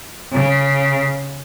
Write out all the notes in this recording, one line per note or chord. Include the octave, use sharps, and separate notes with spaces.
C#3